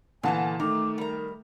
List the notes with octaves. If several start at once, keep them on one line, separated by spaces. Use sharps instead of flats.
A#2 D3 E3 B3 F4 G#5 A5
D#3 A3 A#5 D6
G3 A#4 A#5